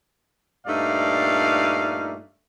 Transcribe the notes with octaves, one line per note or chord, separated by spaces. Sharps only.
G2 A#2 A3 D#4 D5 F5